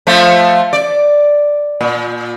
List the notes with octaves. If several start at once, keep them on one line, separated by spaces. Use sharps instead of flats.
F3 A3 F4
D5
A#2